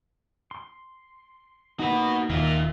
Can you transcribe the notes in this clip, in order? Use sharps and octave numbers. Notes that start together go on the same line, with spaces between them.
C6
A#3 D#4 F#4 B4
D#1 D#3 A#3 F4 E5